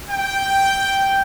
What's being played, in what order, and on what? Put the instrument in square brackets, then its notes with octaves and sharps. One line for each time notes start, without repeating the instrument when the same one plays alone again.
[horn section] G5